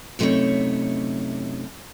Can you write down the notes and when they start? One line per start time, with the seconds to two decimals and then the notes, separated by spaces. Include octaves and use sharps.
0.19 F#2 C3 A3 D#4 E4 C#5